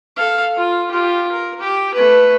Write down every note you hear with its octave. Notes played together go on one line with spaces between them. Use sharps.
A4 F5
F4
F4 G4
A#4
G4
A3 B4